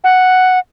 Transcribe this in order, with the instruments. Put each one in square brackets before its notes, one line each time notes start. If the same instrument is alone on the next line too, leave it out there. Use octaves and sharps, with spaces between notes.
[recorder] F#5